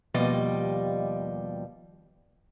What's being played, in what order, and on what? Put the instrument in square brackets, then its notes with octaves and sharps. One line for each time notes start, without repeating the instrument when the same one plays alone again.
[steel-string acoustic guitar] D#2 B2 F3 G3 D5 D#5